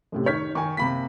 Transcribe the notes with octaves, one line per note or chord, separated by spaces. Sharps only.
F#2 A2 C3
D#3 C#5 F6 G6 B6
D#3 G#5 C#6
C3 A#3 B5 B6